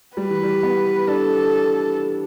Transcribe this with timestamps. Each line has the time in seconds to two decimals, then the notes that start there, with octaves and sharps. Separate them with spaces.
0.17 G3 B4
0.30 E3
0.43 G3
0.63 B3
1.08 D4 A4